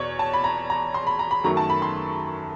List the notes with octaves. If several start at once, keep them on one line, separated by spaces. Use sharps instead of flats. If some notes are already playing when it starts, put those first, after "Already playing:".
Already playing: E2 B2 C#5 D5
A5
B5
A#5
A#5
C6
B5
A#5
B5
F#2 D#3 F#3 A3 A#5
A5
B5
C6